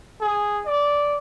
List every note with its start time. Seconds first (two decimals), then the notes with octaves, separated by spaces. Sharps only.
0.21 G#4
0.66 D5